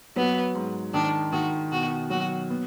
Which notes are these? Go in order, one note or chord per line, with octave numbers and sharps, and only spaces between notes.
F#3 B3
G#2
D#3 D4
D#3 F#4
B2 F#4
F#3 F#4
B3